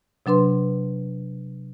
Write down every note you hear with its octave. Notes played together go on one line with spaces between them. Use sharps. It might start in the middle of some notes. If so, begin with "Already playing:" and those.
C3 F#3 D4 B4 C6